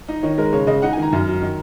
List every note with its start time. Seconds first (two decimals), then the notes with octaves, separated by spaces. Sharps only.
0.08 D#4
0.23 D#3 C#5
0.38 G#3 A#4
0.53 C#3 C#5
0.67 C#3 D#5
0.82 D#4 F#5
0.93 G#5
0.97 D#3
1.02 A#5
1.12 F#2
1.27 F#3
1.42 D#3